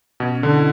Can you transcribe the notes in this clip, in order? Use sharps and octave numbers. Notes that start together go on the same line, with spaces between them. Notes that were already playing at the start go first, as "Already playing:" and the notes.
B2 C#4
C#4
D3
E4